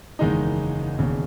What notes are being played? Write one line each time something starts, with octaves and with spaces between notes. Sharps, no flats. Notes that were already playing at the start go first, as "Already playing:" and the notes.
F#1 E2 D#3 G#3 D#4
E1 D#2 C#3